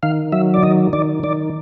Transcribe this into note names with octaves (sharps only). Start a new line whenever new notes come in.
D#3 F5
F#3 E5
D5
D#3 D#5
D#3 D5
D#3 D5